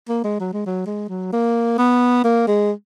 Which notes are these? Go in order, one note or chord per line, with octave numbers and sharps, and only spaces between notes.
A#3
G#3
F#3
G#3
F#3
G#3
F#3
A#3
B3
A#3
G#3